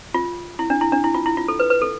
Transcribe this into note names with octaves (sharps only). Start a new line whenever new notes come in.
F4
E4
D4
E4
D4
E4
F4
E4
F4
A4
B4
B4
A4